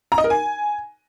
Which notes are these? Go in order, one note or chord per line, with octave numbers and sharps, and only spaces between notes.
A#5
D#5
A#4
G#5